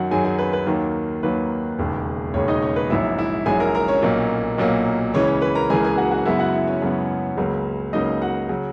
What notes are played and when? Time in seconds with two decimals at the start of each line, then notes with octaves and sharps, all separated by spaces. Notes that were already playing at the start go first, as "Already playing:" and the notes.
Already playing: F#2 D#3 F#3 F#4 F#5
0.11 F#2 D#3 F#3 G#4 G#5
0.24 G#4 G#5
0.39 B4
0.53 B4
0.66 D#2 D#3 F#3 A#3 A#4
1.23 D#2 D#3 F#3 A#3 B4
1.79 E1 D#2 C#3
2.34 E1 D#2 C#3 C#4 C#5
2.48 D#4 D#5
2.62 C#4 C#5
2.76 B4
2.90 A#1 G#2 F#3 E4 E5
3.18 E4 E5
3.46 A#1 G#2 F#3 G#4 G#5
3.60 A#4 A#5
3.75 A#4 A#5
3.88 C#4 C#5
4.02 B1 A#2 F#3 A#3
4.58 B1 A#2 F#3 A#3
5.14 C#2 C#3 E3 C#4 C#5
5.28 C#4 C#5
5.42 B4 B5
5.55 A#4 A#5
5.70 C#2 C#3 E3 G#4 G#5
5.84 G#4 G#5
5.98 F#4 F#5
6.11 F#4 F#5
6.25 F#2 C#3 G#3 B3 E4 E5
6.39 F#4 F#5
6.54 E4 E5
6.67 C#4 C#5
6.81 F#2 C#3 G#3 B3 C#4 C#5
7.37 C#2 C#3 F#3 A#3
7.93 C#2 C#3 F#3 A#3 D#4 D#5
8.22 F#4 F#5
8.49 C#3 F#3